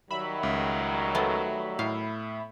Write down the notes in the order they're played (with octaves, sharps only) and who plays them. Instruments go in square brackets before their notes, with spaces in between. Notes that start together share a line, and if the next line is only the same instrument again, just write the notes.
[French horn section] D#3 F#3 G3 [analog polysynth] E5 B5
[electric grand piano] C#2
[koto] A3 B3
[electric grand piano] A2 [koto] F5